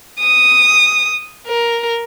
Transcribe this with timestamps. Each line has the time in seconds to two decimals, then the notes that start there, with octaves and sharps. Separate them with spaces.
0.20 D#6
1.47 A#4